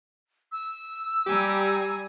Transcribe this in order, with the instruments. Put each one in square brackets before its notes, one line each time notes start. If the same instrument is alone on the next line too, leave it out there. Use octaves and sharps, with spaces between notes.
[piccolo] E6
[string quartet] G3 G#5 A#5 [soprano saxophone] G4